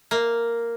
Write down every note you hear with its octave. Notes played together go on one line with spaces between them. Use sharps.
A#3